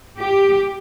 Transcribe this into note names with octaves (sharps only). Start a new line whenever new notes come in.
G4